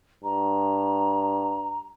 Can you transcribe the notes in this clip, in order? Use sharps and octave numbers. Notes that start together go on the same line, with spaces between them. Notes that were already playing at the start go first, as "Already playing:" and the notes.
G2 A#5